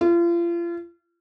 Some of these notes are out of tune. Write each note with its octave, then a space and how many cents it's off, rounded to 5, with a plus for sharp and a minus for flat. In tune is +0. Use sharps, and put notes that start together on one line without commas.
F4 -35